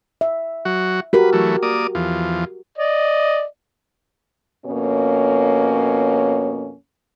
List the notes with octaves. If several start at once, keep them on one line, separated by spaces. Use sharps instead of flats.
E5
F#3 F#4
F#4 G4 A#4 B4
E3 F#3 A3
A#3 D5 D#6
E2 F3
D5 D#5
F2 B2 A#3 C#4 C#5